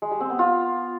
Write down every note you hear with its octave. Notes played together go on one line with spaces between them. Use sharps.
G#3
G3
C4
B3
F4